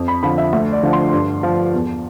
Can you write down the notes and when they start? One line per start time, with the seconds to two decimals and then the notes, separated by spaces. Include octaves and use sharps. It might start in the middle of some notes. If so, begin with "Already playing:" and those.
Already playing: F2
0.08 B5
0.23 D3 F3 B5
0.38 E5
0.53 D2 E5
0.73 D5
0.83 D3 F3
0.93 C6
1.13 G2
1.43 F3
1.73 E2